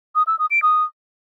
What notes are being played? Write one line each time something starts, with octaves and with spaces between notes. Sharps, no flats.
D#6
E6
D#6
D7
D#6